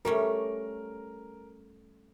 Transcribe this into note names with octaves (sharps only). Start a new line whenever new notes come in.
G3 A3 C#4 A#4